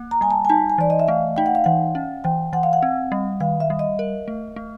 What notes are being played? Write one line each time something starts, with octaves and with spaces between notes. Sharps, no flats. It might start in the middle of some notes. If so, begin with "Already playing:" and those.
Already playing: A#3
A#5
G3 G#5
A5
G#5
D#4 A5
G#5
E3 D5
D#5
E5
A3 F5
D#4 G5
F#5
F5
E3 F#5
C#4
E3 G5
E3 F#5
F5
F#5
C4
G3
D#3 F5
E5
G3
D#5
A#4
A3
A3